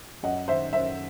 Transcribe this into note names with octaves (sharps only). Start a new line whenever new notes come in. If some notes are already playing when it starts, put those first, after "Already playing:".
F#2 D#5 F#5
D#3 C5 E5
F#2 C5 E5